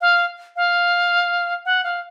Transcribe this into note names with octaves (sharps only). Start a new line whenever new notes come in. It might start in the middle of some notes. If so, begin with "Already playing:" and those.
F5
F5
F#5
F5